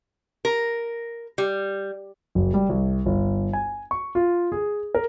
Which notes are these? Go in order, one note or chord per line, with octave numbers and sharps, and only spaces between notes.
A#4
G3
F#1
G3
C2
G1
G#5
C#6
F4
G#4
A#4